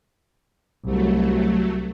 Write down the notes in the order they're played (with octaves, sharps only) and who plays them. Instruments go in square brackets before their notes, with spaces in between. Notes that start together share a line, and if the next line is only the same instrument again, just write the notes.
[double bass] C2 [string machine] F#3 A3